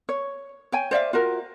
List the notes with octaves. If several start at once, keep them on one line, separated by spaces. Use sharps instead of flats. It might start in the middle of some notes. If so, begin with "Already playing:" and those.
C#5
C#5 G5 G#5
C5 D5 E5 F5
F4 F#4 A#4